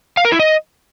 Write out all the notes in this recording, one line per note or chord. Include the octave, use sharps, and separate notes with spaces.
F5
A#4
E4
D#5